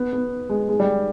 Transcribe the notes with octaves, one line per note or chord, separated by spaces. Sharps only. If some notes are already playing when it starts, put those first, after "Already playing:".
Already playing: B3
B3
G#3
G#3
G3
G#3